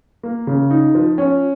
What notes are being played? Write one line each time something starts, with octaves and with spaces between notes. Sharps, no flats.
A#3
C#3
D#4
F3
C#4